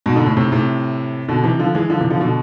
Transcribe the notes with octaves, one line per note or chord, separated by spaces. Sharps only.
G#2 B2
B2 D3
A2
A2 C3
A2 C3
B2 D3
C3 E3
D3 F3
E3 G#3
D3 F3
C3 E3
D3 F3
B2 D3